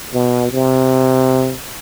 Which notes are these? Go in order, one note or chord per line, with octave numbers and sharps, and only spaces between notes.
B2
C3